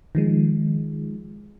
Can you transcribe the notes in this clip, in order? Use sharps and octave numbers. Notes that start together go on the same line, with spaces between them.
D#3 F3 G#3